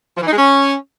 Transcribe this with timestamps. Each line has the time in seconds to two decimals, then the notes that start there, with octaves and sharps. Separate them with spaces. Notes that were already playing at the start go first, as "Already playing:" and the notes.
0.17 F3
0.22 E3
0.27 D#4
0.32 G#3
0.38 C#4